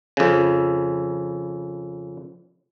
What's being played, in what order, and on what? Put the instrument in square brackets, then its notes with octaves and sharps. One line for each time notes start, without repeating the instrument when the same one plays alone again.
[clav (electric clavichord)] F2 C#3